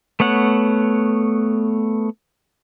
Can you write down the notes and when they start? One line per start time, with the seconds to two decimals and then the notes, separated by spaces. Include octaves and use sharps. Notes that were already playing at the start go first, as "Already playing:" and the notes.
0.20 A3 B3 C#5 F#5